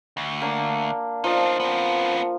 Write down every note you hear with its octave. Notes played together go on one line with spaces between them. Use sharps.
D2
A#3 D4
F3 D4 D#4
B3 C4